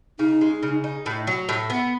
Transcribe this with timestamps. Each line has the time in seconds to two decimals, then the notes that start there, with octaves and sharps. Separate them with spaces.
0.19 C#3 D#4
0.41 G#3
0.63 C#3
0.84 D#4
1.06 A2
1.27 F#3
1.49 A2
1.70 B3